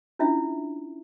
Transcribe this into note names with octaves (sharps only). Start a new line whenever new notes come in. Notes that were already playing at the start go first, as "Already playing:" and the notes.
C#4 D4 E4 F4 E5